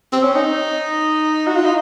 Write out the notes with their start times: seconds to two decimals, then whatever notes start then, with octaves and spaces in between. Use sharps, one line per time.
0.13 C4
0.24 C#4
0.35 D#4
1.47 F#4
1.56 F4
1.65 D#4